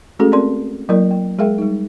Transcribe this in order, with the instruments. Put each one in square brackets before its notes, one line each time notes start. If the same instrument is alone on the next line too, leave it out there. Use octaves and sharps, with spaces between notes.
[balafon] G#3 A3 C#4 F#4 G#4 A4
C4 A#4 D5 C6
F#3 A#3 E4 A#4 D5
G5
G#3 G#4 A#4 E5 F5 G5
G3 D#4